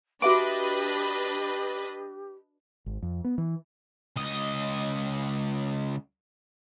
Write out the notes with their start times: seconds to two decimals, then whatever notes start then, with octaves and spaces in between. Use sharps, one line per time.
0.22 D4 F#4 G4 B4 D#5 E5 C6 D6
2.86 G#1
3.03 F2
3.24 B3
3.38 E3
4.16 C#2 D#5